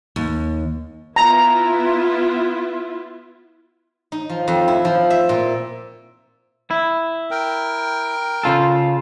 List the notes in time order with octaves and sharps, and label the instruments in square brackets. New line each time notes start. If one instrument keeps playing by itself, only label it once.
[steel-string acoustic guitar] D#2
[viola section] B3 E4 F4 [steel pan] A#5
[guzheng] D#4
F3
F2
E4
F3
E5
A#2
[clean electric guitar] E4
[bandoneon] A#4 G5
[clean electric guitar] C#3 F4 A4